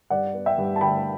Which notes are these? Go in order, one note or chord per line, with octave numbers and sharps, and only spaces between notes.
G2 D5 F#5
B3
E5 G5
G2
A5
D3 G5 B5